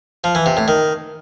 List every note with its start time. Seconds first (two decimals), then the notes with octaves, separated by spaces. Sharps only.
0.24 F3
0.35 E3
0.46 C3
0.57 A2
0.68 D#3